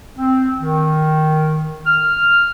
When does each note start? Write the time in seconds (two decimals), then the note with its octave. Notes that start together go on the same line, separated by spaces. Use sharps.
0.18 C4
0.59 D#3
1.87 F6